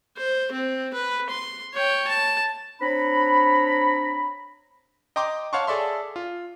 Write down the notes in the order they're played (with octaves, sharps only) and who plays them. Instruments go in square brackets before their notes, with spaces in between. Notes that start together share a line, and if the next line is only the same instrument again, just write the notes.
[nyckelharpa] C5
C4
B4
C6
C#5 G5
A5
[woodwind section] C4 D4 C#5 A#5 B5
[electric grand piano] D#5 G5 A#5 C6 D6
C#5 F5 F#5 A5 C6 C#6
G#4 A4 D5 E5 C6
F4